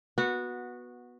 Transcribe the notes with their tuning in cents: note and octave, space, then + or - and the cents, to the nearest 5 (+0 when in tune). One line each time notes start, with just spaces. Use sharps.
B3 -10 F#4 -15